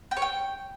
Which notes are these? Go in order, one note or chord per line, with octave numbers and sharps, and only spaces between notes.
G5
C#5
G5